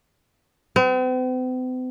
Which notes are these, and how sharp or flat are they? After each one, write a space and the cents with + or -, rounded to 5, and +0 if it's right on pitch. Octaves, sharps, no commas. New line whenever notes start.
C4 -45